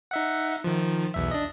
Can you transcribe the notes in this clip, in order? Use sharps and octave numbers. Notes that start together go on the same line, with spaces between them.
D#4 E5 F#5
D#3 F3
B1 E2 E5
D4 D#5